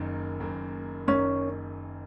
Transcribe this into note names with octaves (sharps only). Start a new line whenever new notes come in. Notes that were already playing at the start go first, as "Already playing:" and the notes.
Already playing: F#1 F#2 D#3 A#3
F#1 F#2 D#3 A#3
F#1 F#2 D#3 A#3 C#4